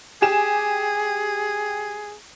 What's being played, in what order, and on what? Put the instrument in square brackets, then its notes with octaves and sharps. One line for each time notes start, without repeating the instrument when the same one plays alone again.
[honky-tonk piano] G4 G#5 E7 [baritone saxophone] G#4